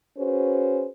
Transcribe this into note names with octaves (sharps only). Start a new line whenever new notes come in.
C#4 F#4 G#4 B4 C5